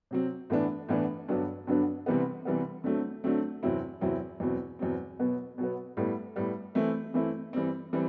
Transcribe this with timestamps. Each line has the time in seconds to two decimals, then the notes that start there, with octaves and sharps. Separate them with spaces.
0.11 C3 F#3 C4
0.50 A2 E3 B3 D4
0.89 A2 E3 B3 D4
1.28 G2 D3 F#3 B3 D4
1.67 G2 D3 F#3 B3 D4
2.06 C3 E3 G3 B3
2.45 C3 E3 G3 B3
2.84 D3 F#3 A3 C4
3.24 D3 F#3 A3 C4
3.63 E2 C3 F#3 C4 E4
4.01 E2 C3 F#3 C4 E4
4.40 E2 B2 F#3 C4
4.79 E2 B2 F#3 C4
5.19 B2 F#3 B3
5.58 B2 F#3 B3
5.97 A2 G3 B3
6.36 A2 G3 B3
6.75 E3 A3 C4 E4
7.14 E3 A3 C4 E4
7.53 E3 G3 C4
7.93 E3 G3 C4